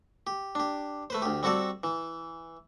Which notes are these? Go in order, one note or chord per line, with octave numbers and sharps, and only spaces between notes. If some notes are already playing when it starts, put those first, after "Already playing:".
G4
D4 G4
A3 B4 C5
D2 G4
G3 C4 F#4 A4 D5
E3